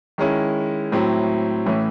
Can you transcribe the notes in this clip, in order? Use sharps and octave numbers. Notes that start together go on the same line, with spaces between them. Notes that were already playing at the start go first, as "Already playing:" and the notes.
D#3 G#3 C#4 E4
A2 F#3 C4 E4
A2 E3 A3 C#4